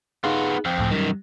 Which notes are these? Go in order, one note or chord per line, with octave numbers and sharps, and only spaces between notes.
B3 D#4 F4 G#4
F2 C4
C#2 A2
F#2 D#3 G3